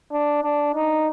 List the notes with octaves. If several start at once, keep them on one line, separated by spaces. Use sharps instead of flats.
D4
D4
D#4